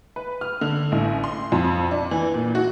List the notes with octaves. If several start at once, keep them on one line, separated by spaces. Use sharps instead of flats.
B4
F6
D3
A1
C6
F2
D4
E3
A#2
F#4